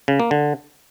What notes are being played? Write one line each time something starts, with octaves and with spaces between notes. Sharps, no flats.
C#3
A#3
D3